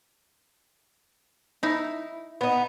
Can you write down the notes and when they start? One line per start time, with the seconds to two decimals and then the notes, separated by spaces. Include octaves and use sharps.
1.63 D#4 E4
2.41 B3 D#4